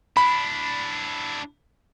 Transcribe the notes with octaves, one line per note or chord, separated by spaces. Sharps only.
D4 E4 B5